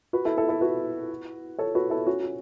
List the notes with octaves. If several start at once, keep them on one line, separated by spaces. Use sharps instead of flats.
F#4 B4
E4 A4
E4 A4
E4 A4
F#4 B4
A4 C#5
F#4 B4
E4 A4
C#4 F#4
F#4